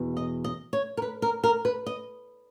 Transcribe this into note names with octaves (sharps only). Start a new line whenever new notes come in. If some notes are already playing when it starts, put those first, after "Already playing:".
Already playing: E2 B2
D#5
D#5
C#5
A#4
B4
A#4
A#4
B4
D#5